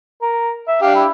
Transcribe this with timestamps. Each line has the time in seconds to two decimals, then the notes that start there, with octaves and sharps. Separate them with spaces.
0.22 A#4
0.68 E5
0.82 D4 G4 F5
0.95 E4